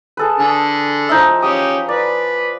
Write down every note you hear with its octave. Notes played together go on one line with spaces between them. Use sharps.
G#4 A4 B4
D3 G#4 A4
F3 D#4 E5
C#4 G4 F5 D#6
B4 D5